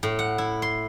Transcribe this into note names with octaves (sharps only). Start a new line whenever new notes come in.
A2
F#5
E4
C6